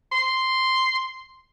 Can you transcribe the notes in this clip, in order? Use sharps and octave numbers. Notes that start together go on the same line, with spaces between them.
C6